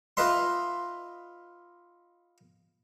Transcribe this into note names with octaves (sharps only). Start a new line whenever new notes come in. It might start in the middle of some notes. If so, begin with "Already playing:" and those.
D#4 F4 B4 D#5 E5 C6